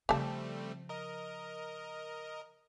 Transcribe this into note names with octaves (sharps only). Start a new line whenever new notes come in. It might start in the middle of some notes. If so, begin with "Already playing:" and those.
C#3 F3 G3 A3 C4 G4 A5
A#4 D#5